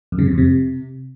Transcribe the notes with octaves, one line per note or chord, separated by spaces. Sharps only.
F#2
C#3
C3
F2
C3